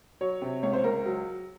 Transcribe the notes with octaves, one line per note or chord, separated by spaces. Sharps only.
F#3 C#5
C3
C#2 C#5
C5
C#2 A#4
F#3